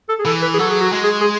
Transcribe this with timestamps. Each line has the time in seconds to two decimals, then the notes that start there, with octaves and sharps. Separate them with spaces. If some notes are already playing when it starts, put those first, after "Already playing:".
0.09 A4
0.19 G#4
0.25 E3 A4
0.42 B4
0.54 G#4
0.59 F#3 A4
0.70 G#4
0.81 F#4
0.93 G#3
1.03 G#4
1.21 G#4